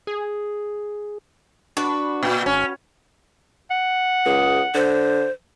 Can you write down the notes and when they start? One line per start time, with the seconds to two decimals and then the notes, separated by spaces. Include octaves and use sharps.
0.07 G#4
1.77 D4 F#4 B4
2.23 A#2
2.46 G#1 C#4
3.71 F#5
4.26 C#2 G#4
4.75 D3 C5